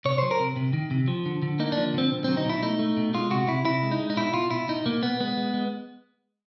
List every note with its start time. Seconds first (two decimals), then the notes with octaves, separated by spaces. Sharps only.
0.05 C3 C#5
0.18 F#3 C5
0.31 A#4
0.40 C3
0.56 C3
0.73 D#3
0.91 C3
1.08 F3
1.26 D3
1.42 D3
1.59 A#3 D#4
1.72 F3 D4
1.94 D3 C4
2.11 B2
2.24 F#3 C4
2.37 D#4
2.45 B2 E4
2.63 A3 D#4
2.79 A3
2.97 B2
3.14 G#3 F4
3.30 C3 F#4
3.48 C3 E4
3.65 C3 E4
3.83 G#3
3.91 D#4
4.00 G#3
4.10 D#4
4.17 B2 E4
4.33 B2 F4
4.51 B2 E4
4.68 B2 D#4
4.86 B2 A#3
5.02 B2 B3
5.20 G#3 B3
5.37 G#3
5.54 G#3